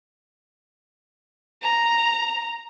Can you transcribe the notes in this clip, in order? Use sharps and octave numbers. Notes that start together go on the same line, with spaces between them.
A#5